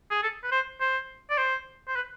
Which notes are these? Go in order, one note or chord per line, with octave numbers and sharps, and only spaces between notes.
G#4
A4
B4
C5
C5
D5
C5
C5
B4